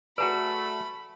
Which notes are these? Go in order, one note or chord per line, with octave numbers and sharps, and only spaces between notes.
A3 F#4 G#4 B4 D5 A#5 B5